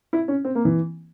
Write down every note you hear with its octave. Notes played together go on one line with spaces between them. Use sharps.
E4
C#4
C4
A#3
E3